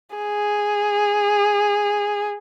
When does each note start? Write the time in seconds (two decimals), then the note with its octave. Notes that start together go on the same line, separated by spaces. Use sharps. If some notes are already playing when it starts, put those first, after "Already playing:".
0.16 G#4